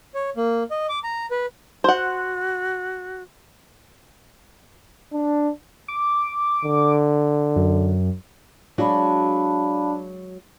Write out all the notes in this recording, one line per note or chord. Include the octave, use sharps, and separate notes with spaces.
C#5
A#3
D#5
D6
A#5
B4
F#4 C5 F#5
D4
D6
D3
F#2
F#3 G#3 D4 F#4 F5 A5 B5